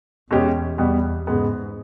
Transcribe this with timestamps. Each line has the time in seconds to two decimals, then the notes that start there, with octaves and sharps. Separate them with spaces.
0.30 E2 B2 G#3 C#4 G4
0.78 E2 B2 G3 B3
1.27 G#2 C#3 G#3 B3